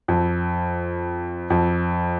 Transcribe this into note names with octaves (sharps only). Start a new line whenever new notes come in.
F2
F2